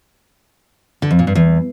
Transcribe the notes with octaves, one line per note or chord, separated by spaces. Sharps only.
D3
F2
A#2
G2
E2